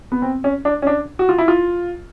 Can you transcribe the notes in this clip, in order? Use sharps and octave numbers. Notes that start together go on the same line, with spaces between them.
B3
C4
C#4
D4
C#4
D4
F#4
F4
E4
F4